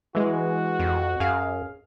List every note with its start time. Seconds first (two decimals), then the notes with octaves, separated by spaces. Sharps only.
0.15 E3 G#3 F#4
0.79 F2
1.20 F#2 G#4 F5